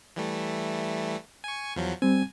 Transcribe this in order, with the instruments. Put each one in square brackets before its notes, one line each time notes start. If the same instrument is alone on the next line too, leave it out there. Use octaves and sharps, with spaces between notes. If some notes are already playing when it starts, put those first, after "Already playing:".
[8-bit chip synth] E3 G3 A3
G#5 C#6
E2 F3 F#3
[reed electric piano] G3 C4 [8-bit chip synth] G#5